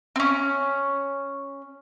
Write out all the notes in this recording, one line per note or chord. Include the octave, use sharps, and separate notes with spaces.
C4 C#4